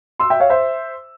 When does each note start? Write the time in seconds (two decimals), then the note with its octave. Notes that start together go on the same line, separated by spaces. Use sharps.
0.19 C6 E6
0.30 E5 G5
0.40 C#5 F5
0.50 C5 E5